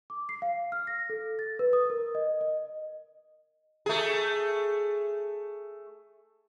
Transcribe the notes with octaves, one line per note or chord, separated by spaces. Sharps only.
D6
C7
F5
F6
A#6
A4
A6
B4
D#6
A#4
D#5
D#5
A3 G#4